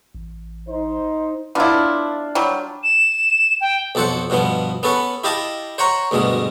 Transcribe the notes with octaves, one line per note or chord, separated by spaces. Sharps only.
A1
D#4 C5
B3 D4 E4 F4
F#3 G3
E7
G5
B1 F2 A4 C5 F#5
G2 B2 F3 B3
B3 C#4 A4 B4
E4 G4 D#5 F5 A5
C5 C#5 F#5 A#5
D2 G2 B2 G#3